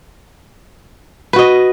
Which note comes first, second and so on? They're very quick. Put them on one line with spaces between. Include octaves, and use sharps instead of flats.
B4 F#4 D#5